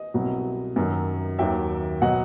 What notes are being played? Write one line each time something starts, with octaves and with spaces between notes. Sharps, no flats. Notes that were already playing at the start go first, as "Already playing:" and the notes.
Already playing: D#5
C2 B2 F#3
F#2 D#3 F#3
D#2 D#3 F#3 E5 G5
B2 F#3 D#5 F#5